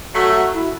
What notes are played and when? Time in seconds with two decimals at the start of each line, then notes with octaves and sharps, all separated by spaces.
0.14 F#3 A3 F#4
0.34 F#4
0.54 E4